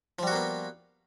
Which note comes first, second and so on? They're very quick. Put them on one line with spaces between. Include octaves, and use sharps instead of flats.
F3 G3 F#4 A#3 B3